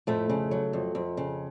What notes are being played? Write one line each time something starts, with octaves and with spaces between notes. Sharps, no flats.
F2 A2 A3
C#3
F#3
F2
F2
C#3